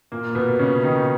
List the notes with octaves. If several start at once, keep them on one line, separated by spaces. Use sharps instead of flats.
A#2 A#3
B2 B3
C#3 C#4
D#3 D#4